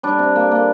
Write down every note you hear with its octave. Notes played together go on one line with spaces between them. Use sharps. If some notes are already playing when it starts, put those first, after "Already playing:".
G3 D4
C3
A#3
A#3